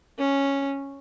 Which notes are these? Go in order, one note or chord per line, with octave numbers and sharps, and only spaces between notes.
C#4